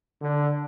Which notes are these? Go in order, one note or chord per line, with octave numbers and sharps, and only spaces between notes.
D3